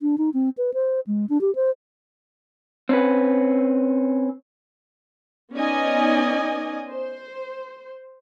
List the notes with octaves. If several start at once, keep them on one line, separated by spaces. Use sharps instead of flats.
D4
D#4
C4
B4
C5
G#3
D4
G4
C5
C4 C#4 B4
B3 C#4 D#4 D5 D#5 G#5
C5